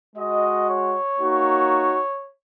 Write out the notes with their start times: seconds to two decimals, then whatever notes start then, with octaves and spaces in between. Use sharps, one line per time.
0.16 G#3 F#4 D#5
0.68 C#5
1.19 A#3 D#4 F#4